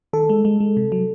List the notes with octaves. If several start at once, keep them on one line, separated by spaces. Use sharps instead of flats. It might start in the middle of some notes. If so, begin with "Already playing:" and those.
D#3 A4
G#3
G#3
G#3
C3
F#3